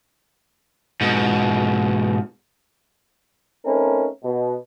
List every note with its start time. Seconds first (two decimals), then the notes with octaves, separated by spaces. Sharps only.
1.01 G#2 B2
3.65 A3 C4 C#4 D#4 A#4 B4
4.24 B2